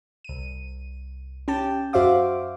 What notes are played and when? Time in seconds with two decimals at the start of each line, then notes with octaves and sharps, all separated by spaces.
0.25 C2 D#7
1.48 C#4 G4 G5 A5
1.93 F#2 F#4 C5 E5 F5 D6